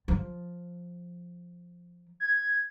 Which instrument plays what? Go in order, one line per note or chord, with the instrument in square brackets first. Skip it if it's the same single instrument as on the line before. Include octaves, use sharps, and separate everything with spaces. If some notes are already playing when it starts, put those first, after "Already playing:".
[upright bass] F3
[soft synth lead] G#6